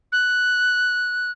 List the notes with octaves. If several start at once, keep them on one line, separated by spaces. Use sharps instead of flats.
F#6